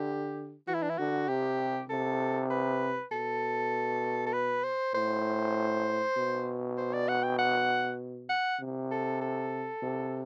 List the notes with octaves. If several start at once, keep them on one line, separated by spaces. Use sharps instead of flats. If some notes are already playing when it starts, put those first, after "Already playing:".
Already playing: D3 G4
E3 F#4
E4
D4
E4
D3 F#4
C3 G4
C3 A4
B4
B2 A4
A4
B4
C5
A2 C5
B2
C5
D5
F#5
G5
F#5
F#5
C3
A4
A4
C3